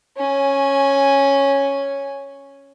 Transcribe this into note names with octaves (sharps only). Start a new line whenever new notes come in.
C#4 G#5